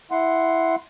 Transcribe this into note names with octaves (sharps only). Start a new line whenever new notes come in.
E4 F#5 C6